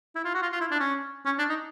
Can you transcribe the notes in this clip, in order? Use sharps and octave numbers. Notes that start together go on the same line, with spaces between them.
E4
F4
F#4
F4
F4
E4
D4
C#4
C#4
D4
D#4